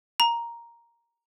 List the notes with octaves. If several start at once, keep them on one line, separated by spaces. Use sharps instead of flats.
A#5